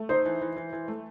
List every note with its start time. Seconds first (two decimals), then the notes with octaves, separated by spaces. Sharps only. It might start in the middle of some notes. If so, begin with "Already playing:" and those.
Already playing: A3
0.09 D#4 C5
0.25 E3
0.41 E3
0.56 E3
0.73 E3
0.88 A3